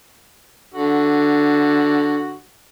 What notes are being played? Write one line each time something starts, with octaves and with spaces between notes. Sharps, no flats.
D3 F#4